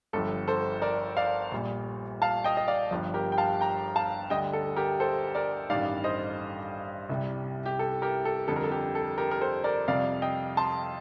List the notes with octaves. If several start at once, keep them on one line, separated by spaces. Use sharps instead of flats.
G1 G2 F3 A4
A4 C5
A#4 D5
D5 F5
A#1 A#2 G3
F5 A5
D#5 G5
D#5
D5 F5
G1 G2 F3
G4 A#4
G5
F5 A5
G5 A#5
F5 A5
D2 D3 G3 D#5 G5
A4
G4 A#4
A4 C5
A#4 D5
A1 G2 D#3 G3 D5 F5
C5 D#5
C2 C3 G3
G4
A4
G4 A#4
A4
F2 D3 G3 A4
A#4
A4
G4
A4
G4 A#4
A#4
A4 C5
A#4 D5
F2 C3 G3 D5 F5
D#5 G5
A5 C6